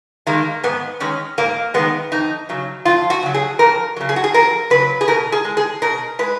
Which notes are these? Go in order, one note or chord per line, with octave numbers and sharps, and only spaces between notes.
D#3 G#3 A#3
G#2 B3
D#3 G#3 C#4
G#2 A#3
D#3 G#3 B3
F2 D#4
C#3 F#3
F2 F4
F#4
C#3 F#3
G#4
F2 A#4
C#3 F#3
G#4
F#4
G#4
F2 A#4
C#3 F#3 B4
G#4
B2 A#4
G#4
G#3
G#4
B2 A#4
G#3 B4